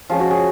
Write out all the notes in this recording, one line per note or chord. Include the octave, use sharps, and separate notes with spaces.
F3 G#3 C#4 F4
F#4
G#4